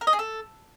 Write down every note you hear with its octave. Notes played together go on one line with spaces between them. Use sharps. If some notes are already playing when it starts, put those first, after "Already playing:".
A#4
D#5
G#4
A4